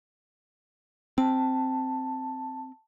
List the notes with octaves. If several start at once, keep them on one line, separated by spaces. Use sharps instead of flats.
C4 A5